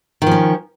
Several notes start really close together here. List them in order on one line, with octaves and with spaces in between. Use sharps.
D#3 F3 C#4